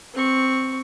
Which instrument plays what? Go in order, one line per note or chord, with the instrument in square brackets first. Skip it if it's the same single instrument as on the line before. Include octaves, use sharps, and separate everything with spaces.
[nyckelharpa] C4 C#6